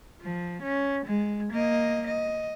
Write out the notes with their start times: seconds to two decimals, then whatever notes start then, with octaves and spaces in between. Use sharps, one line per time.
0.22 F3
0.63 C#4
1.06 G#3
1.53 A#3 D#5
2.07 D#5